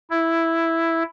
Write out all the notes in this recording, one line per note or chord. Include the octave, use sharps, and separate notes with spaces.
E4